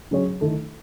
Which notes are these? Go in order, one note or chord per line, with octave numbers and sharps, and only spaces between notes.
C#3 F#3 C#4 G#4 C#5
D#3 A3 E4 A4